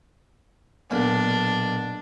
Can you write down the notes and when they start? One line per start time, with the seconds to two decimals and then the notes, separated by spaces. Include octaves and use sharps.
0.91 B1 A#2 D4